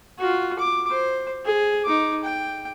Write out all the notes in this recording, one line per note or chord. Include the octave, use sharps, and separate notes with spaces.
F4 F#4
D6
C5
G#4
D#4 D6
G5